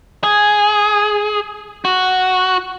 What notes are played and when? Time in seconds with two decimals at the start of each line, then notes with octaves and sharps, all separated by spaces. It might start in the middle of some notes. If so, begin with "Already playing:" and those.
0.23 G#4
1.85 F#4